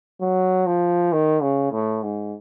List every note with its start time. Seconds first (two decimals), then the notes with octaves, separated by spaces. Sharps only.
0.21 F#3
0.67 F3
1.13 D#3
1.42 C#3
1.72 A2
2.03 G#2